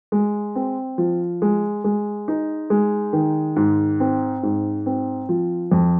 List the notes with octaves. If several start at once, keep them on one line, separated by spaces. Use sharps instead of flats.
G#3
C4
F3
G#3
G#3
D#4
G#3
D#3
G#2
C4
G#2
C4
F3
F2